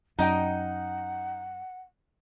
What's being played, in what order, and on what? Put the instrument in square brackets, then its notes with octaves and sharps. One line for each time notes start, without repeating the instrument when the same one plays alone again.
[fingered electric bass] F#2 [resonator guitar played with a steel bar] D#4 D#5 G5 [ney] F#5